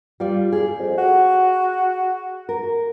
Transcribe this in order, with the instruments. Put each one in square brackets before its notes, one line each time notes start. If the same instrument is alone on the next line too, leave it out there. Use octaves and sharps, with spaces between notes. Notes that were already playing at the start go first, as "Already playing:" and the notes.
[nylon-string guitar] G3 F4 D5
G#4
[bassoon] F2
F#4
[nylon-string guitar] A#4